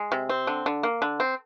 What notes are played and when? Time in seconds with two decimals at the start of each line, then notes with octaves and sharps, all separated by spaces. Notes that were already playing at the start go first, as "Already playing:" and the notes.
Already playing: G#3
0.12 C3
0.29 C4
0.47 D3
0.66 D3
0.83 A#3
1.02 D3
1.20 C4